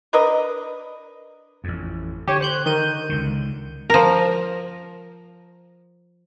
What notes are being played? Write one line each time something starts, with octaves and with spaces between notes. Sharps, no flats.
D4 A#4 B4 D#5
A1 F2
D3 G4 C#5
C5 F#6 G6
D#3 G6 D#7
C#2 D3
F3 A#4